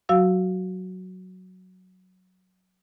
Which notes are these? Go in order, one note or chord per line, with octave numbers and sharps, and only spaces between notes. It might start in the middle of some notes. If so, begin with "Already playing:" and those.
F#3 F#4 F5 E6